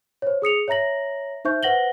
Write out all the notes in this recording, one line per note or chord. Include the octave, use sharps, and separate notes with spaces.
C5 C#5
G#4 D#6 C#7 F7
C#5 E5 A#5 A#6 F#7
D#4 C5 E5 C#6 G6
B4 C5 F#5 A#6 F#7 G7